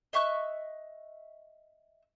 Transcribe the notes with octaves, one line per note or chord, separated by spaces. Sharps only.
D#5 E5 C#6 F#6